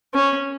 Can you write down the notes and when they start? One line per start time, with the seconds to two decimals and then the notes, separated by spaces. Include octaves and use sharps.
0.14 C#4